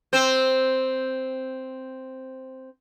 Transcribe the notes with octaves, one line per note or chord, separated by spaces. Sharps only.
C4 C5